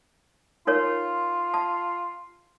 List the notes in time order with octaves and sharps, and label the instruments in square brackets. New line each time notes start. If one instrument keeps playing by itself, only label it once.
[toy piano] D#4 A#4 C#5 [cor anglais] F4
[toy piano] A5